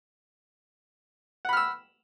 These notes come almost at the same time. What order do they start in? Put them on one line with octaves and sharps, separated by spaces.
F#5 B5 F6 E6